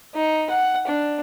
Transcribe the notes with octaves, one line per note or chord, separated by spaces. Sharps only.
D#4
F#5
D4